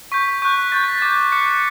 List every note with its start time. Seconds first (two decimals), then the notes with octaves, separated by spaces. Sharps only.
0.12 C#6 G6 B6
0.42 C#6 F#6 G6
0.72 C#6 G6 A6
0.84 B6
0.95 A6
1.02 D6 G6
1.32 D6 F#6 C#7